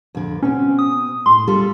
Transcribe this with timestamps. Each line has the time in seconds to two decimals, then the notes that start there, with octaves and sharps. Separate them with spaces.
0.15 F2 D3
0.43 B2 C4 C#4
0.79 D#6
1.26 A2 C6
1.48 G3 F4 A4